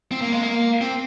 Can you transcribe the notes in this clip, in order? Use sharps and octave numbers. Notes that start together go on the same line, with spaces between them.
C4
A#3
G#3
A#3
C4